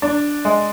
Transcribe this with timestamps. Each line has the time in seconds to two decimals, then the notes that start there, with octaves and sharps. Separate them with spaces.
0.02 D4
0.45 G#3